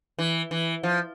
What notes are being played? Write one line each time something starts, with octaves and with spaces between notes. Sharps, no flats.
E3
E3
F3